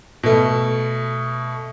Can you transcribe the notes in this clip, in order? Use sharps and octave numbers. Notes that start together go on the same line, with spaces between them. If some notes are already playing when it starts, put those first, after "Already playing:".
B2 A3